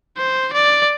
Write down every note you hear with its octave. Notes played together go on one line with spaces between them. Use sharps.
C5
D5